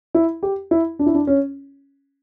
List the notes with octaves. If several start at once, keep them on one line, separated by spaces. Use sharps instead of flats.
E4
G4
E4
D4
E4
D4
C#4